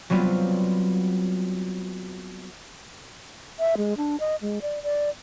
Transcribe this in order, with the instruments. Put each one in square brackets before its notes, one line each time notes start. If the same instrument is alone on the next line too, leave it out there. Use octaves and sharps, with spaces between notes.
[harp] F#3 G3 B3 C4 F4
[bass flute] E5
G#3
D4
D#5
G#3
D5
D5